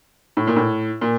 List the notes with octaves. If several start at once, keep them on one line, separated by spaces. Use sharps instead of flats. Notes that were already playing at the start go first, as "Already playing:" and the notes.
A2
A#2
A2
A#2